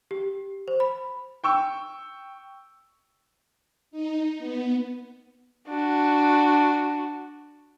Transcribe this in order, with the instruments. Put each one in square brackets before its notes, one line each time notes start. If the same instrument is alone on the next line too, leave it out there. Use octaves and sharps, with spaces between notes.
[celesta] G4
C5
B5
[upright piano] G5 C#6 E6
[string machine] D#4
B3
[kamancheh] D4 F#4